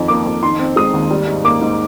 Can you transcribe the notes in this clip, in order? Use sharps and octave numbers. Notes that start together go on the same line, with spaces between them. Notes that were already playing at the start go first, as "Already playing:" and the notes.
Already playing: F2 D#3
A#3 D6
F2
D#3 C6
C4
G#3 D#6
D#2
G3
G#2
A#3 D6
G#2